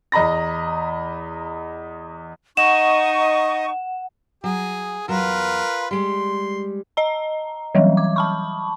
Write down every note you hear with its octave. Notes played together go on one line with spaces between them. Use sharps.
E2 D#5 A#5 B5 A#6
D#4 D#5 F#5 C#6 E7
F#3 G#4
E2 F#3 F4 A#4 B4
G3 G#3 C6
D#5 A#5
E3 F#3 G3
D6
A5 B5 C#6